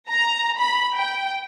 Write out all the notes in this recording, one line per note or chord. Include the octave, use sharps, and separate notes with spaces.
A#5
B5
G5